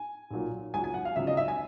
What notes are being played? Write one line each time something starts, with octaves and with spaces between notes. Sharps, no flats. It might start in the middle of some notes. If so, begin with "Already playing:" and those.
Already playing: G#5
B1 A#2 F#3
C#2 C#3 F#3 G#5
G#5
F#5
F5
C#2 C#3 F#3 E5
D#5
E5
G#5